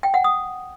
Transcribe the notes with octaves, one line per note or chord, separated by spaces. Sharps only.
G5
F#5
D#6